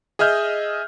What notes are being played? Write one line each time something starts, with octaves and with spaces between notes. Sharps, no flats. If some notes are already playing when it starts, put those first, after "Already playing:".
G#4 D#5 E5 F6 G6